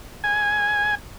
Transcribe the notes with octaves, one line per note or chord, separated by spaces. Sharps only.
G#5